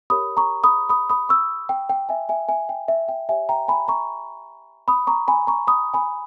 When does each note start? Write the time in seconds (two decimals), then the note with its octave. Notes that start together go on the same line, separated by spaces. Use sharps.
0.10 G4 A#4 C#5 B5 D#6
0.37 A#5 C#6
0.63 B5 D#6
0.89 B5 D#6
1.10 B5 D#6
1.29 C#6 E6
1.69 G5
1.89 G5
2.09 E5 G#5
2.29 E5 G#5
2.49 E5 G#5
2.69 G5
2.88 E5
3.08 G5
3.29 G4 C#5 E5 G#5
3.49 G5 A#5
3.68 G#5 B5
3.88 A#5 C#6
4.88 B5 D#6
5.07 A#5 C#6
5.28 G#5 B5
5.47 A#5 C#6
5.67 B5 D#6
5.94 G#5 B5